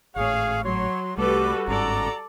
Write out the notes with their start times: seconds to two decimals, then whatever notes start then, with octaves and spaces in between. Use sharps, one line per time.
0.16 G#1 A2 G#4 C#5 F5
0.64 F#3 C#5 C6
1.17 C2 G3 A3 F#4 A4 B4 D6
1.68 G1 G#2 C#4 A4 D5 A#5